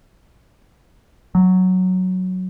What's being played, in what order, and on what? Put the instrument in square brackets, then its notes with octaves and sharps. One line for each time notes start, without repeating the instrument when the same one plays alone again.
[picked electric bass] F#3